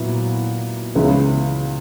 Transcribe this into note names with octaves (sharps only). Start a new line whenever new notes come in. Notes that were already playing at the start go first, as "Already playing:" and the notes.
Already playing: A#2 F#3 B3 E4
C#2 C#3 E3 B3 E4